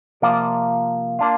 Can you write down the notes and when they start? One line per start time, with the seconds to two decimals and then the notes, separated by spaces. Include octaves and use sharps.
0.22 C3 F3 A#3 F4 D5
1.19 A#3 D4 F4